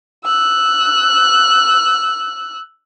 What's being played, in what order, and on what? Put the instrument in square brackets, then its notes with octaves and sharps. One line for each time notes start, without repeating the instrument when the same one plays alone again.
[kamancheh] E6 F#6